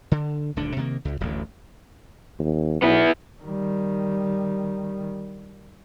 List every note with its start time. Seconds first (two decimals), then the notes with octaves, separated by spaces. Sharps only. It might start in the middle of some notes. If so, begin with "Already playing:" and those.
0.12 D3
0.56 D#1 D2 D3 D4
0.77 C3 D#3 G#3 A#3
1.05 C#2
1.20 D1 A1 D2
2.39 D#2
2.82 B1 B3 E4
3.43 D#3 G3